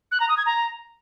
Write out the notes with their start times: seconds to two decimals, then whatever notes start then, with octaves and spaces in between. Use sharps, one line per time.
0.12 F#6
0.20 A#5
0.29 D#6
0.37 G#6
0.46 A#5